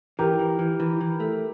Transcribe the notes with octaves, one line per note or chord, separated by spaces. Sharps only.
E3 G4 A#4
E3
E3
E3
E3
A3